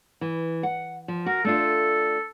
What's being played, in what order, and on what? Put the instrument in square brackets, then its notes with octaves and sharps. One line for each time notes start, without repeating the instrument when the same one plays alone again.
[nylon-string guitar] E3
F#5
F3
[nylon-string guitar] F#4 [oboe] A#4
[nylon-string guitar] A3 D4 F4 [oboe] A4